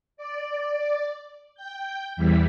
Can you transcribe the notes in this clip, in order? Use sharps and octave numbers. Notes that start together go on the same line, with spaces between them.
D5
G5 G6
E2 E3 G3 B6